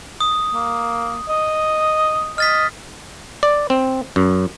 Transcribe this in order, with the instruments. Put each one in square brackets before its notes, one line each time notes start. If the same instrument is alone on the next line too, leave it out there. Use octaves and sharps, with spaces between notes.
[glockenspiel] D#6
[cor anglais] A#3
D#5
[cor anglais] D#5 [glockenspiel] F6 A6 B6
[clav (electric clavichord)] D5
C4
F#2